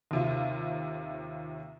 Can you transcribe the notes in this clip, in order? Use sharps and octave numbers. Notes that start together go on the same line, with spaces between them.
D#2 C3 F4